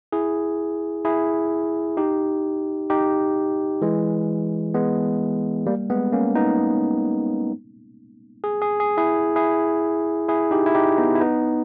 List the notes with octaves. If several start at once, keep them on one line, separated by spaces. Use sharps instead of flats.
E4 G#4
E4 G#4
D#4 G4
D#4 G4
E3 G#3
G#3 B3
G3 A#3
G#3 B3
A#3 C#4
B3 D#4
G#4
G#4
G#4
E4 G#4
E4 G#4
E4 G#4
D#4 G4
E4
D#4 G4
B3 D#4
E4
B3 D#4